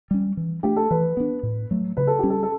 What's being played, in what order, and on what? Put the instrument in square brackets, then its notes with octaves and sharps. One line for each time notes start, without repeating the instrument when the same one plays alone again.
[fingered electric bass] G3 C#4
E3
[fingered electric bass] A3 D4 [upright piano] G4
[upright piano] A4
[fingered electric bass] E3 [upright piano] B4
[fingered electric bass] B3 D4
A2
F#3 A3
[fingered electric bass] C#3 [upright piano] B4
[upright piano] A4
[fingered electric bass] G3 C#4 [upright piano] G4
[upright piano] A4
A4